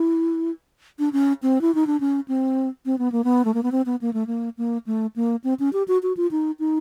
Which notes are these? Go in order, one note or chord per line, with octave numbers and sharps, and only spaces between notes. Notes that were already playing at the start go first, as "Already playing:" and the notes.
Already playing: E4
D4
C#4
C4
E4
D#4
D4
C#4
C4
C4
B3
A#3
B3
A3
A#3
B3
C4
B3
A#3
A3
A#3
A#3
A3
A#3
C4
C#4
G4
F#4
F#4
F4
D#4
D#4